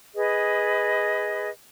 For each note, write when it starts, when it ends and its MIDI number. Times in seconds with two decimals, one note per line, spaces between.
0.15 1.49 68
0.15 1.49 71
0.15 1.49 75